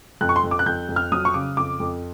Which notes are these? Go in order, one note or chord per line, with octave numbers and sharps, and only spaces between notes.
F2 F#6
C#6
C6
F2
D6
F#6
F2 G6
F2
F6
F#3 D#6
C#6
C#3 D6
F2 D6
F2